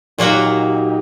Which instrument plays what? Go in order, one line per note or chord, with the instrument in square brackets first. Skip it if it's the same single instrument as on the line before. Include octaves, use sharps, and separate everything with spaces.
[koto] A#2 F#3 A#3 F#4 [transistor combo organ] D#4 G4